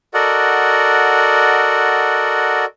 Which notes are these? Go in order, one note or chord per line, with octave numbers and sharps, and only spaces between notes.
F#4 A4 A#4 D5 D#5 F#5